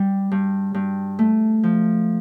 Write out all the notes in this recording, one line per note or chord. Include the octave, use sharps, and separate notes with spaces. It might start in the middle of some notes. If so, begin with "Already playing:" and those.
Already playing: G3
G2
G2
A3
F3